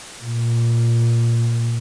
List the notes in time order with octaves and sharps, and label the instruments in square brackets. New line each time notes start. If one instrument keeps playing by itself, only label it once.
[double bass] A#2